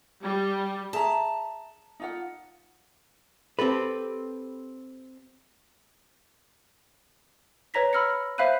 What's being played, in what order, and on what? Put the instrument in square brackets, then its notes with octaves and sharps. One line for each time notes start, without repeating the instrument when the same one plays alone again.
[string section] G3
[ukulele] G#4 E5 A#5 [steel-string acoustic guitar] A5
[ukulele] D#4 F4 F#5
[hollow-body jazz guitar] C4 G4 A4 B4
[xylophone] B4 C#5 A#5 A#6 B6
B5 E6 F6 A#6 C#7
C5 E5 F5 B5 F#6 D#7